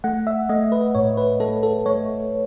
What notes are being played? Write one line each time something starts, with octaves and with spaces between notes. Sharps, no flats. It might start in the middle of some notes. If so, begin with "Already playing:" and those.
A3 F#5
E5
A3 D#5
B4
A2 C#5
B4
A3 A4
A4
A3 C#5